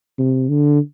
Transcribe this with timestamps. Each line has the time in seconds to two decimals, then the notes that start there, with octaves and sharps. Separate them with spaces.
0.18 C3
0.49 D3